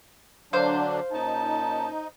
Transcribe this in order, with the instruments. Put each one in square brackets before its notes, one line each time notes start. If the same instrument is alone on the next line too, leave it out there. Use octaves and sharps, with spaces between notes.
[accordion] D3 F#3 D4 [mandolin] C5 F5
[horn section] A#2 C#4 A5 [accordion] D#4